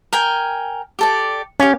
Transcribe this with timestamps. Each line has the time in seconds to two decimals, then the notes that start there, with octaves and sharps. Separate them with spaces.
0.13 A#4 G5 G#5
0.99 G4 A4 D5
1.60 C#4 G4 F5